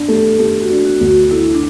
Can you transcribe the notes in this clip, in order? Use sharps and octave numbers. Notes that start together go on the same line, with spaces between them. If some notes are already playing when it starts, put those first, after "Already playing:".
Already playing: D4
A3 G4
A4
A3 G4
F#4
D4
F#4
D2
F#4
A3 E4
D4